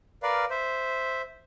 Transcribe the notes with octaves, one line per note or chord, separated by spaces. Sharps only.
A#4 B4 D5 F5
C5 E5